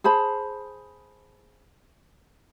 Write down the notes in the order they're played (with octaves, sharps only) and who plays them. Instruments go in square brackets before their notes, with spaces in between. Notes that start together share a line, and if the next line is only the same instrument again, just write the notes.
[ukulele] G#4 C5 A5 B5